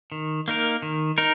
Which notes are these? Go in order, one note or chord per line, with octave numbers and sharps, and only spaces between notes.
D#3
A#3 D#4 A#4
D#3
D#4 A#4